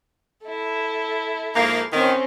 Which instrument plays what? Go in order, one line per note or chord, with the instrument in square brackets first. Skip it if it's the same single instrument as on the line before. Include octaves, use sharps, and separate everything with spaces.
[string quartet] E4 A4
[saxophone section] G#2 F3 A#3
[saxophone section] A2 D#3 [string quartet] C4 C#4